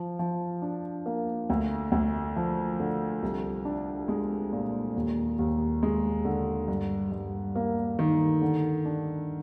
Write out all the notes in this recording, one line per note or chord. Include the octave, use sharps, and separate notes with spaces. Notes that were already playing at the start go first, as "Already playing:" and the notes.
Already playing: F3
F3
D4
A#3
D2
D2
F3
D3
C2
D4
G#3
A#2
D#2
D#2
G#3
D3
G2
G2
A#3
D#3
D3
D4